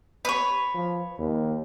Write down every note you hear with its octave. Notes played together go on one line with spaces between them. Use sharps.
B4 C#5
F3
D#2